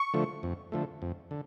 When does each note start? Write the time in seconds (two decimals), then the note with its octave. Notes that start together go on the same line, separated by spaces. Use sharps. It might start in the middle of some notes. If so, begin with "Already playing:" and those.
Already playing: C#6
0.14 D3 F3 A3
0.43 F2
0.72 D3 F3 A3
1.02 F2
1.31 D3